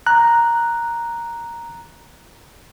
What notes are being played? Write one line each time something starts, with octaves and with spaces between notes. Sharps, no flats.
A#5 F#6